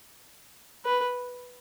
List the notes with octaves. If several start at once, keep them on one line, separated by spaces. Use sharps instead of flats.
B4